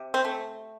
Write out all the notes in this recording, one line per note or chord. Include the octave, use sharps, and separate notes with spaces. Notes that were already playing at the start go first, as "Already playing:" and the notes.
Already playing: C3
C4
A3